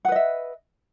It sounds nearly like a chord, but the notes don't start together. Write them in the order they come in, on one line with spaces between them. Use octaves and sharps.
F#5 B4 D#5 E5